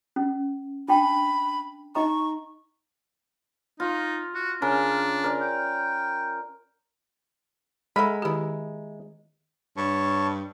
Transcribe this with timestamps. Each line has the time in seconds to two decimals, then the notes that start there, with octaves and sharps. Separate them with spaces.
0.16 C#4
0.88 D4 G5 A5 B5
1.95 D#4 D#5 A#5 C#6
3.80 D#4 F4
4.35 F#4
4.62 C#3 D4 A#4
5.24 A#4 D5
5.41 G5
7.96 G#3 A4 E5 F#5 A#5 B5
8.22 D#3 A#3 E4 G4
9.77 G2 C#5 A5 C#6